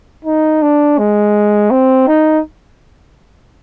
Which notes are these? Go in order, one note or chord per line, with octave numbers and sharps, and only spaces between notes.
D#4
D4
G#3
C4
D#4